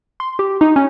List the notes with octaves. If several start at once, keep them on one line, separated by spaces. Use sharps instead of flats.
C6
G4
D#4
C#4